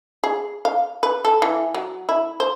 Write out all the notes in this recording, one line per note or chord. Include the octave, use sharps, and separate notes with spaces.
G#4
F5
B4
A4
E3
F#3
E4
C5